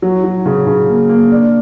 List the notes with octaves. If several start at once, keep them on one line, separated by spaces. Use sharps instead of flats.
F#3
F#3
C#3
C#3
A#3
A#3
D4